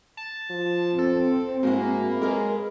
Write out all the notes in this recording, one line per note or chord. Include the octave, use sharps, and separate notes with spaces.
A5
F3
C4 A4
G#2 G#3 A#3 E4 F#4
F#2 G#3 A#4 B4